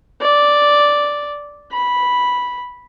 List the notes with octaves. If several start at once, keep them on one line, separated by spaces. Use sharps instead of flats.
D5
B5